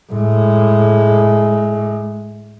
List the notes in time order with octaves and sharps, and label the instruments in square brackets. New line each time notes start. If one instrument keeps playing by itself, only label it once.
[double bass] A2 G#3